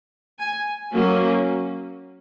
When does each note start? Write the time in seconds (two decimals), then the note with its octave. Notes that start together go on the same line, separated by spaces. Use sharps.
0.39 G#5
0.91 F#3 A#3 C#4